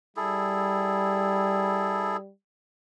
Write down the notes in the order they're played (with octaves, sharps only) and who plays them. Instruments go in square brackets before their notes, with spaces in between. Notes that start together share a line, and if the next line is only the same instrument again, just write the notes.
[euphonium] G3 [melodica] E4 G#4 A4